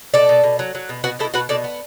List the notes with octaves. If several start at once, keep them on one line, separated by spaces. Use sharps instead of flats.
B2 A4 D5
B2
B2
F#3
F#3
B2
B2 F#4 B4
B2 E4 A4
B2 F#4 B4
B2 A4 D5
B3